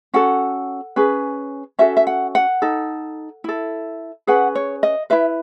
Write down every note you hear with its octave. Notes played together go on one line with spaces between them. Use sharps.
C#4 F#4 A4 F#5
C#4 G#4 B4
C#4 F#4 A4 E5
E5
F#5
F#5
D#4 A4
E4 A4
C#4 G#4 B4 F#5
C#5
D#5
E4 B4 E5